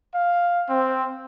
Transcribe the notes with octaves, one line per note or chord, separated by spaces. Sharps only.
F5
C4